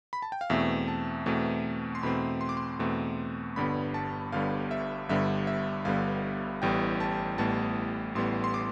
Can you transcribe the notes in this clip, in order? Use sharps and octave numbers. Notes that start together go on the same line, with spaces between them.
B5
A5
G5
F5
E2 B2 A3 C4 E5
A5
E2 B2 A3 C4
C6
E2 B2 A3 C4 B5
C6
D6
C6
E2 B2 A3 C4
G1 G2 D3 G3 B3 B5
A5
G1 G2 D3 G3 B3 F5
E5
G1 G2 D3 G3 B3 E5
E5
G1 G2 D3 G3 B3 F5
A1 A2 G3 B3 G5
A5
A1 A2 G3 B3 A5
A1 A2 G3 B3 C6
C6
D6